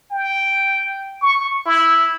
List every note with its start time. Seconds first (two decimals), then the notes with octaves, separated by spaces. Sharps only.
0.11 G5
1.21 C#6
1.66 E4